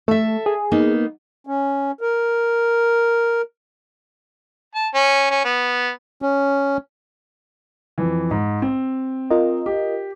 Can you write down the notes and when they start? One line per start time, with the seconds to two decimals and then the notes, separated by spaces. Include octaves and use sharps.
0.08 A3 A4 E5
0.46 G#4
0.71 A#3 B3 D#4
1.47 C#4
2.01 A#4
4.75 A5
4.94 C#4
5.31 C#4
5.45 B3
6.22 C#4
7.98 F2 E3
8.31 G#2
8.62 C4
9.30 F4 A#4 D#5
9.66 G4